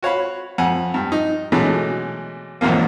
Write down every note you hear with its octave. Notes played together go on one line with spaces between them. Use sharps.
F#4 C#5 F5 B5
F2 F#5 G#5
G2
D#4
B2 E3 F#3 G#3 A3 D4
B1 E2 G#2 F3 A#3